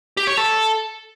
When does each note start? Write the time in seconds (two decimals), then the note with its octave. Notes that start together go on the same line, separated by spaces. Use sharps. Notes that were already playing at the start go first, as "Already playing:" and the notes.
0.17 G4
0.27 C#5
0.37 A4